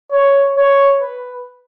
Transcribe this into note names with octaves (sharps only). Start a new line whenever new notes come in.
C#5
C#5
B4